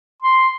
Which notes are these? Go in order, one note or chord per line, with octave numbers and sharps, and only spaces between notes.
C6